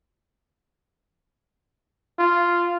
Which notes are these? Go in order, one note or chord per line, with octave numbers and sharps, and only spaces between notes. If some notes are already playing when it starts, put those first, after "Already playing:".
F4